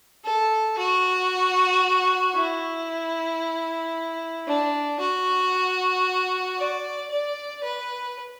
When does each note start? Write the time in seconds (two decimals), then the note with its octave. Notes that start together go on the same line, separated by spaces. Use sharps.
0.24 A4
0.78 F#4
2.35 E4
4.47 D4
5.00 F#4
6.58 D5
7.10 D5
7.63 B4